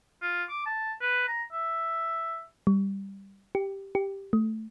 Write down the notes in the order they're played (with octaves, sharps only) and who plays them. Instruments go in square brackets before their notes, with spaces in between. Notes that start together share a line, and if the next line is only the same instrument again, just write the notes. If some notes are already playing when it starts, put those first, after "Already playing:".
[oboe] F4
D6
A5
B4
A#5
E5
[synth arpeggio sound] G3
G4
G4
A3